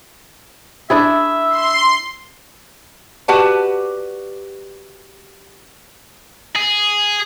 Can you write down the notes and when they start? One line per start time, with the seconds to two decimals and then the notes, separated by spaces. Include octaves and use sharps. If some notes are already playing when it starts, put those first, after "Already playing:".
0.90 D4 E4 G#4 E5
1.50 C6
3.28 F#4 G4 B4 D5 F#5 A5
6.56 G#4